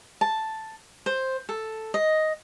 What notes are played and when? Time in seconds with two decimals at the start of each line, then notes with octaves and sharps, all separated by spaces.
0.21 A5
1.06 C5
1.49 A4
1.94 D#5